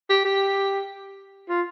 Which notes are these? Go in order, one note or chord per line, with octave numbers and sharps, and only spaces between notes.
G4
G4
F4